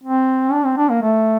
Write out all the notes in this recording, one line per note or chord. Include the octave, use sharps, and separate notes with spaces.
C4
D4
C4
D4
A#3
A3